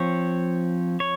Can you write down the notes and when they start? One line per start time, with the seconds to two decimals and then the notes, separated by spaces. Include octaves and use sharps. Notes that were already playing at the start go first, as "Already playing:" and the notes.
Already playing: F3 C4 C#5
1.00 C#5